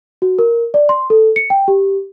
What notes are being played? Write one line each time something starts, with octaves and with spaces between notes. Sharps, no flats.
F#4
A#4
D5
C6
A4
C#7
G5
G4